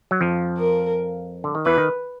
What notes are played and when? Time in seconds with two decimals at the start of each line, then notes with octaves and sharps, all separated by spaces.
0.11 F#3
0.21 F2 F3
0.58 A#4
1.44 D3
1.55 D#3
1.65 E2 E3 B4
1.78 D#3